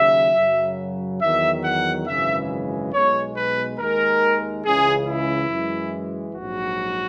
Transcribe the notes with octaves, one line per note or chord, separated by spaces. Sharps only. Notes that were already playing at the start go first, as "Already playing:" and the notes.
Already playing: D#2 C#3 F#3 E5
F#2 C#3 F#3
E2 D#3 F#3 E5
F#5
G#1 F#2 C#3 E3 G#3 E5
B1 B2 G#3 C#5
B4
D#2 D#3 G#3 A#4
C#2 C#3 E3 G#3 G#4
E4
F#2 E3 G#3
A#1 G#2 F#3 F#4